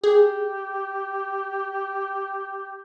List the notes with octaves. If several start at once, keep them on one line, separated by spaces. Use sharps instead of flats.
G4 G#4